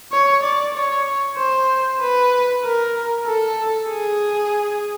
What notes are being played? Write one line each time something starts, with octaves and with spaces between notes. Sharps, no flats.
C#5
D5
C#5
C5
B4
A#4
A4
G#4